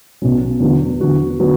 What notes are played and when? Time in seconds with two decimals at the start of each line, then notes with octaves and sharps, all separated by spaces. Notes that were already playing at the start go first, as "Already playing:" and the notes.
0.22 B1 B2 F#3 C#4
0.60 E2 D3 F#3 B3 F#4
1.00 E2 D3 F#3 B3 F#4
1.39 D3 F#3 B3 F#4